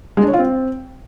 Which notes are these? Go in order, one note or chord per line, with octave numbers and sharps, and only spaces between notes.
G#3
D4
C#5
F4
C4